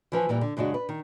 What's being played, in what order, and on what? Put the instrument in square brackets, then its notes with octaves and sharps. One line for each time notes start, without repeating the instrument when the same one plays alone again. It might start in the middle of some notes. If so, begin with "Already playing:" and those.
[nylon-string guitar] E3 F3 B4 G#5
A#2 E3 G3
D3
F#2 C#3 G#3 D4 F#4
B4
D#3